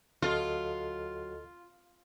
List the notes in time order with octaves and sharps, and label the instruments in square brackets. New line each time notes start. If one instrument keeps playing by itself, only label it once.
[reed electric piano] D2 A4 D#5 [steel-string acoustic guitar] F#3 [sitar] F4